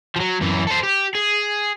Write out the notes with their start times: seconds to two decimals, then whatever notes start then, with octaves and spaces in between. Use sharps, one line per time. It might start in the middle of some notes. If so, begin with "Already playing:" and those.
0.16 F3 F#3
0.41 F#2 E3
0.67 A4 C5
0.83 G4
1.15 G#4